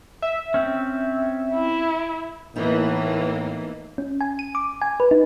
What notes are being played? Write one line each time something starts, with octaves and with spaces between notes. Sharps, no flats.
E5
C4 C#4
E4
A2 E3 A#3 B3 D#4
C#4
G#5
D#7
D6
G#5
B4
D#4